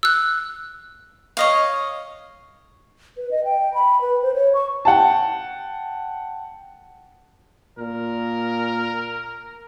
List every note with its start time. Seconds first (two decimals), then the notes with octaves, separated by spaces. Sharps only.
0.03 E6 F#6
1.37 C#5 D#5 F5
3.17 B4
3.31 D#5
3.44 G5
3.74 B5
4.01 B4
4.22 C5
4.34 C#5
4.54 C#6
4.85 F#5 G5 A5
7.78 A#2 A#4